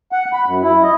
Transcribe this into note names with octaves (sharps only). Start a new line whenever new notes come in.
F#5
B5
F#2
E4
D#5